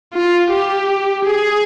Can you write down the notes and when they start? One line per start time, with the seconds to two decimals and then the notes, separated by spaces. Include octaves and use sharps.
0.13 F4
0.50 G4
1.25 G#4